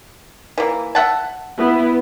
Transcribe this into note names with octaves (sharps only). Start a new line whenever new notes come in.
E3 A#3
E5 F#5 A5
B3 E4